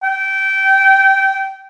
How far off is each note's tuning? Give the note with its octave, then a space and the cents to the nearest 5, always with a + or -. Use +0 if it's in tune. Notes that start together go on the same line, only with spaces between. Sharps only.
G5 -20